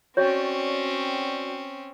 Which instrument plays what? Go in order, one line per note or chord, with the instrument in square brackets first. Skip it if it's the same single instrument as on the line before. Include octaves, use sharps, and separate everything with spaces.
[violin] C4 C#4 [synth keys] F#4 D5 G5 [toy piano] C#5